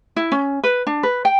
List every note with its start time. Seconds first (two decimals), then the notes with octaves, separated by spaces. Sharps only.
0.16 E4
0.32 C#4
0.64 B4
0.87 D4
1.03 B4
1.25 G5